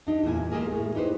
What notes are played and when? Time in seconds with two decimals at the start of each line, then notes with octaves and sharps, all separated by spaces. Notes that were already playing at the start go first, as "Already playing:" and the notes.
0.07 D4 D#4 G4
0.23 E2 G2 A#2 A#3 E4 G#5
0.52 G#3 A#3 G4 G#4 A#4
0.72 A2
0.95 D#4 G4 B4 C5